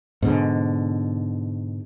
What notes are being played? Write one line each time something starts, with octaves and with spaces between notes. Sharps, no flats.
G#2 B2 D3